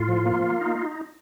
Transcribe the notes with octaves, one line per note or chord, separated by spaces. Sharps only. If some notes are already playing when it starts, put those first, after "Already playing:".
Already playing: A2 F4
F3
A#3
A#3
D#4